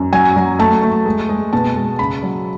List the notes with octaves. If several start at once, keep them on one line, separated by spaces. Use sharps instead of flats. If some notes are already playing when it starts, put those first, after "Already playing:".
Already playing: F#2
F#3 G#5
F#3
A3 A5
A3
G#3
G#3
B2 A5
G#3
C#3 B5
F#3